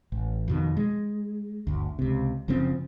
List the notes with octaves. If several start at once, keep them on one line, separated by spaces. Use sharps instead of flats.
A1
F2 B2 D#3
G#3
G1 D2
C#2 C3
F#1 C#3 F3 C4